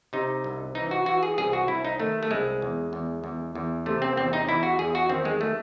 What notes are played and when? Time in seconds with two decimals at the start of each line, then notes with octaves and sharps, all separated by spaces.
0.13 C3 D#4
0.44 C2
0.75 E3 D#4
0.91 F#4
1.06 E3 F#4
1.23 G#4
1.38 C2 G#4
1.53 F#4
1.68 C2 E4
1.85 D#4
2.00 D#3 A3
2.23 A3
2.31 C2 G#3
2.62 E2
2.93 E2
3.24 E2
3.55 E2
3.86 C3 A3
4.02 C4
4.17 E2 C4
4.33 D#4
4.49 E2 E4
4.63 F#4
4.79 E2 G#4
4.95 F#4
5.09 D#3 C4
5.25 G#3
5.41 A3